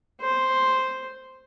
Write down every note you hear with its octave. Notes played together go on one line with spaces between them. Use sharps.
C5